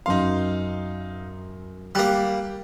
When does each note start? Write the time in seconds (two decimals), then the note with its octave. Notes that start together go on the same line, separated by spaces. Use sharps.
0.06 F#2 D#4 F5 C6
1.95 G3 A#3 G4 F#6